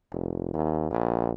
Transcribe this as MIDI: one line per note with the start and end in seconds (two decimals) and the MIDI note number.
0.12 0.52 29
0.53 0.87 39
0.90 1.31 34